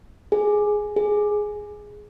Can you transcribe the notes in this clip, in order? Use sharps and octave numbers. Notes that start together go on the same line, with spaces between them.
G#4
G#4